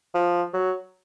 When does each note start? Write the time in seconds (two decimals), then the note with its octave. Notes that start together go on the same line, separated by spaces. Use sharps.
0.15 F3
0.54 F#3